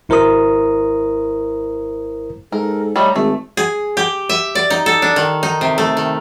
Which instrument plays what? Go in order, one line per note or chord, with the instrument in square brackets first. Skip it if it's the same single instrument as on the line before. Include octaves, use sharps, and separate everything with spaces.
[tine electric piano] G#1 E4 A#4 C5 A#5 D#6
[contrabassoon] G#2 [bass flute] A4 [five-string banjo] A#4
[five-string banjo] G3 A3 D#4 [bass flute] C#5
[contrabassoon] G#1 [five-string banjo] A3 [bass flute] G#4
[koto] G#4
G4
E5
D5
D#4
A4
D4
D#3
D#4
C3
A3
D#3